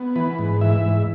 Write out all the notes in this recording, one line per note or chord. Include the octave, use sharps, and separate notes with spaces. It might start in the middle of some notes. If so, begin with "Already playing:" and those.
Already playing: B3
E3 B4
G#2
E3 E5
G#2